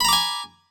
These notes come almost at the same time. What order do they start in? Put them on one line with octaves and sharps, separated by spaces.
B5 A#5 D6 G#5